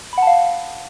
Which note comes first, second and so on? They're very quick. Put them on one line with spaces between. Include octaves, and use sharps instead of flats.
B5 F#5 A5 F5